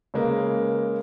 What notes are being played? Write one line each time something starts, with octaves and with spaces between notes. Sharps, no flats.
C#3 G#3 A#3 B4